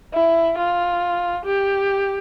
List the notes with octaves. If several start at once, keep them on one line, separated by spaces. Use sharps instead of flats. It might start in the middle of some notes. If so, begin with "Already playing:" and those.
E4
F4
G4